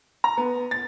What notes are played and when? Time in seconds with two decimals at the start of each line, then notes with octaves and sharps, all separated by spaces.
0.24 A#5
0.37 B3
0.71 A6